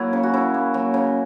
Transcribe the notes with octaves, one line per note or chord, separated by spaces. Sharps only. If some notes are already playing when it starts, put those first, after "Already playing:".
Already playing: F#3 A#3 E4
C#3
F#4
C#3 E4
A#3
F#3
C#3